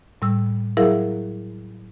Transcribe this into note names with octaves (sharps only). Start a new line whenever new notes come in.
A2 G3 E6
F#3 E4 G#4 A#4 E5 F5